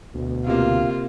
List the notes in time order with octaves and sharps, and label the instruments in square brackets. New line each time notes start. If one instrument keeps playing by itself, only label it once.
[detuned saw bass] D2 [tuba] B2
[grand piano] C3 A#3 [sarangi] F4